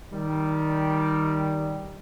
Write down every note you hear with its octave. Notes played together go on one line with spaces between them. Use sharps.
D#3 G3